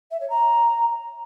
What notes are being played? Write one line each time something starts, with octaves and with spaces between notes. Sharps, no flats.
E5
C#5
A#5